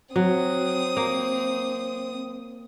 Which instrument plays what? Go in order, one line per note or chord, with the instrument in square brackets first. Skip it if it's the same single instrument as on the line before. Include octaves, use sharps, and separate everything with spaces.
[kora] F#3 [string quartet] C4 D#6
[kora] A#3